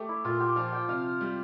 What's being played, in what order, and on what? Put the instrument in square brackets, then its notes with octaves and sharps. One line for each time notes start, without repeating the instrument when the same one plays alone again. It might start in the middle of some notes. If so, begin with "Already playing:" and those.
Already playing: [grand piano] A3 [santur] G4
[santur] E4
[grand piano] A#2 [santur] F4
[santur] G4
[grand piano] F3 [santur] F5
[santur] G5
[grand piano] C3 [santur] F5
[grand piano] G3